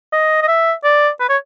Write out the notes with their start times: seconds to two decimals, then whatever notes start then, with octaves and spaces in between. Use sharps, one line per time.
0.12 D#5
0.42 D#5
0.48 E5
0.84 D5
1.20 B4
1.29 C#5